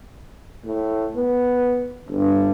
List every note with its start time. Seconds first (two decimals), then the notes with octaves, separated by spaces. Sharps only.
0.65 A2
1.16 B3
2.08 G1 G2